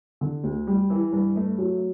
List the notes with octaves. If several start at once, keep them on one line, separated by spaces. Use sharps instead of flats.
D3
D2
G3
E3
G2
A3
F#3